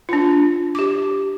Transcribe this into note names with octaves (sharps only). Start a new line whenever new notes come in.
D4 F4
G4 D6